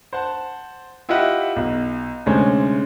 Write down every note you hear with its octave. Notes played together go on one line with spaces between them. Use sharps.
C5 F#5 A5
E4 F4 G4 D#5 E5 F#5
B1
D2 C3 G#3 C#4 C5